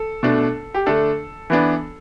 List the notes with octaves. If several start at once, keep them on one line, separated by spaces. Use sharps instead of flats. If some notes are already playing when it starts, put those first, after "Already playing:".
Already playing: A4
B2 A3 D4
G4
D3 A3 D4 A4
E3 B3 D4